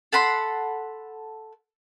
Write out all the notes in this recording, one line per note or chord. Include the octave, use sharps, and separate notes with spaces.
A4 F#5 B5 C6